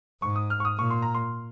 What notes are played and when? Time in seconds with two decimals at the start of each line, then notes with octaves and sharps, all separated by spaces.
0.22 G#2 C#6
0.36 D#6
0.50 F6
0.60 C#6
0.65 D#6
0.78 A#2 C#6
0.90 C6
1.02 A#5
1.15 C6